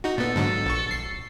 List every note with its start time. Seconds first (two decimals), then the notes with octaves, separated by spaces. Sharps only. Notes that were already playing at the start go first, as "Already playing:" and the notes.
0.04 D#4 F#4
0.18 A#2 B3 A4
0.36 G#2 D3 F#3
0.65 A#1 C#6
0.91 C7